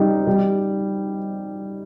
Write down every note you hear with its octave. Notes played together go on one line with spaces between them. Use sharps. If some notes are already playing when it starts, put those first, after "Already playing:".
Already playing: G3 C4 D#4
G3